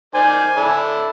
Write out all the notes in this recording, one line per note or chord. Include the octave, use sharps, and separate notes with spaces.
D#3 C5 D5 G#5
D4 E4 A4